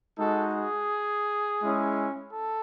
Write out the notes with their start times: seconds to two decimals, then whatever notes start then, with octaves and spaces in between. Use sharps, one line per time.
0.17 G#3 D#4 F#4 A4
0.53 G#4
1.61 G#3 C#4 E4
2.32 A4